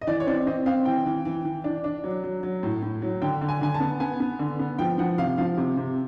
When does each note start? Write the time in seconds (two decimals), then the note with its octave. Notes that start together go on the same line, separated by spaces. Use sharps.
0.01 D#5
0.07 E3 D5
0.20 C#5
0.27 C4 D5
0.47 C4 D#5
0.66 C4 F5
0.85 E3 G5
1.06 E3
1.25 E3
1.45 E3
1.64 D4
1.84 D4
2.04 F#3
2.24 F#3
2.43 F#3
2.63 A2
2.82 A2
3.02 F#3
3.22 D3 G5
3.41 D3
3.49 G#5
3.61 D3 G#5
3.74 A5
3.80 B3
4.00 B3 G#5
4.20 B3
4.39 D3
4.59 B3
4.79 F3 G5
4.98 F3 F#5
5.18 C3 F5
5.38 F3 F5
5.58 C3
5.77 C3